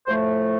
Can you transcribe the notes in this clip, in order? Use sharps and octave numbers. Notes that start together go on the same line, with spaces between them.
A2 F3 A3 C5